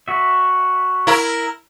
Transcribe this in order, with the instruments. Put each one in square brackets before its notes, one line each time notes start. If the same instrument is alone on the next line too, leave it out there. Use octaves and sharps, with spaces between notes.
[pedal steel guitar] F#4 E5
[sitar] E4 A#4